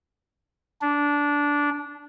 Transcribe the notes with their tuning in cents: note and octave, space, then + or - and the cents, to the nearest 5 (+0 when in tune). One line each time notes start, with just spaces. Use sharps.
D4 -15